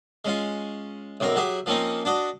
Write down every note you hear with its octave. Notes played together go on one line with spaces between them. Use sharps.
G#3 C#4 F4
B1 F#2 C4 A#4
F#3 G4 G#4 E5
F3 A#3 C4 C#4 D#4
D4 F#4 D#5